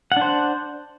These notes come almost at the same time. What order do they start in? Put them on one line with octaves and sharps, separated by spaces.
F#5 D4 C5